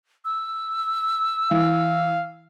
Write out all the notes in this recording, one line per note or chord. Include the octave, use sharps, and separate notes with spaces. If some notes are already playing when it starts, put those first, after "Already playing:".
E6
E3 F5